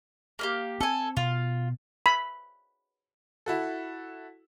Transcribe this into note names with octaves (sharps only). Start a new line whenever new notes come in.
A#3 E4 G4
C4 A4 G#5
B2 F4
B5
E4 F#4 A4